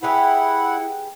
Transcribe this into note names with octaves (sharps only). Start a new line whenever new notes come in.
E4 G4 G#4 B4 F#5